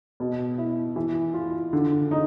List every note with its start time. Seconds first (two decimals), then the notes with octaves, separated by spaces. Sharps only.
0.20 B2
0.58 E4
0.96 E3
1.34 F4
1.73 D3
2.11 D#4